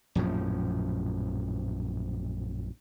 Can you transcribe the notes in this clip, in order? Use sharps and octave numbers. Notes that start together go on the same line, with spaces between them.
A#1 F#2 A2 F3